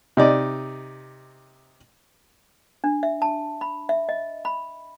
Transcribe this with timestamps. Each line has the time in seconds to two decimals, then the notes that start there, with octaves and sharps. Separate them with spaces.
0.17 C3 D#4 D5
2.84 D4
3.03 E5
3.22 A5
3.61 B5
3.89 E5
4.09 D#5
4.45 B5